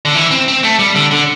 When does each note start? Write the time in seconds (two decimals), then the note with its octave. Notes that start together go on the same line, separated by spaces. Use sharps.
0.05 D3
0.15 E3
0.31 C4
0.48 C4
0.63 A3
0.79 G3
0.95 D3
1.11 D3